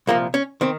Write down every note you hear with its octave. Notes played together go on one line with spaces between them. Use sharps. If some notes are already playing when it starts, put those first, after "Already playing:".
C2 A#2 F3 A#3
C#4
D#3 C4